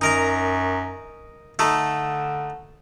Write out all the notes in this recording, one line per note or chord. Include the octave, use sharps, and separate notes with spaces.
F#2 D#4 A#4 A#5
D3 A3 D#4 A4